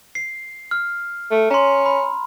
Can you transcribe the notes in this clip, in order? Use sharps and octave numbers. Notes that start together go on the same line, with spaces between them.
C7
F6
A3
C#4 A#5 C6
B5